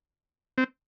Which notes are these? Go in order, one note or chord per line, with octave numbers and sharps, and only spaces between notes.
C4